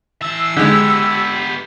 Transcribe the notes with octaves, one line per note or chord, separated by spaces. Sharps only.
E3 A5 E6
D3 G#3 B3 G4